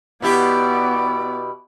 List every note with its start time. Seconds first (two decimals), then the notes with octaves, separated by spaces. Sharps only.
0.22 B2 B3 E4 G4 D5